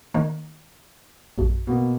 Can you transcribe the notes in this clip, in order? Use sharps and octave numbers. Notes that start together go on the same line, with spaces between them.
D#3 A#3
A#1 F#2
B2 A#3